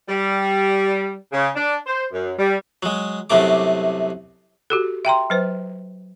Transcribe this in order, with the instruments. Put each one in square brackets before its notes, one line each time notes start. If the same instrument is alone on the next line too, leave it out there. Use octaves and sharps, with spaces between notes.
[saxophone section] G3
C#3
D4
C5
F#2
G3
[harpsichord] F#3 G#3
C2 F#2 C3 F#3 A3 D6
[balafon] F#4 G4 A4
E5 G5 A#5 C6
F#3 B4 C5